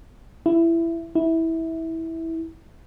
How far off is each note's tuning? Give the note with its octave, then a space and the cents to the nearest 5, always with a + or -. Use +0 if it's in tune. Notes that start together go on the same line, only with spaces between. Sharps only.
E4 +15
E4 -15